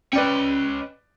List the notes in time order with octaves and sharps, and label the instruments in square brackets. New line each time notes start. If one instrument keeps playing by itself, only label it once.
[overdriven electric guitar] C#4 D#5 [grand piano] B4 D5 G5